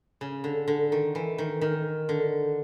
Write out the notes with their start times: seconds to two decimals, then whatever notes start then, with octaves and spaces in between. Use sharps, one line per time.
0.21 C#3
0.44 D3
0.68 D3
0.92 D#3
1.15 E3
1.38 D#3
1.61 D#3
2.09 D3